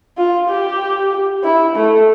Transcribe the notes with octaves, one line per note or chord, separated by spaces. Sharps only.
F4
G4
E4
A3